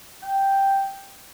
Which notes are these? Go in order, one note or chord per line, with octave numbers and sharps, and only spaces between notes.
G5